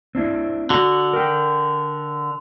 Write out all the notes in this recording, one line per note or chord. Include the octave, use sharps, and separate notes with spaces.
C4 D4 E4
D3 F#4
A#4 G5